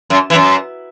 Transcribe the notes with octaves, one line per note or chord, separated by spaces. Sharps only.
F#2
E3
F#2